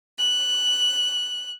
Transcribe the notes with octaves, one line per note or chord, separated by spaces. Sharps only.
F#6